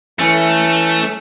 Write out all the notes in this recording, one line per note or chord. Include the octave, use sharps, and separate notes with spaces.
E3 A3 C#4